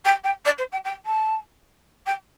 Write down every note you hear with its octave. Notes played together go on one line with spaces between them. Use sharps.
G5
G5
D5
C5
G5
G5
A5
G5